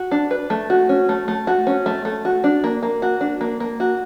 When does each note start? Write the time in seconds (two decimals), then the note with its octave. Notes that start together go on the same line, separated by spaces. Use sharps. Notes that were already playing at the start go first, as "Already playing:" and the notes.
Already playing: F#4
0.11 D4
0.31 B4
0.50 A3
0.70 F#4
0.89 C#4
1.09 A3
1.28 A3
1.47 F#4
1.67 C#4
1.86 A3
2.05 A3
2.25 F#4
2.44 D4
2.64 A#3
2.83 A#3
3.02 F#4
3.21 D4
3.41 A#3
3.60 A#3
3.80 F#4